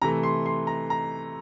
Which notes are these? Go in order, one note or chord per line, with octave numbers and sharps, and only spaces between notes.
C3 E3 A3 A#5
C6
C6
A#5
A#5